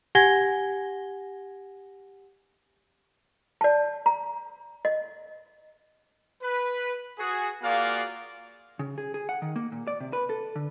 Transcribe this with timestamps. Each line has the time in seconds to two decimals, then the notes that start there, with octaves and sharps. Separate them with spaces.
0.15 G4 F#5 G#5 G#6 A#6 G7
3.61 D5 A5
4.06 A#5
4.85 D#5
6.43 B4
7.19 F#4 G#4
7.63 A#3 F4 F#4 G#4 D5 F5
8.79 C#3
8.98 G#4
9.14 G#4
9.29 F#5
9.42 D#3
9.56 A#3
9.72 A#2
9.87 D5
10.00 C3
10.13 B4
10.30 A4
10.56 D3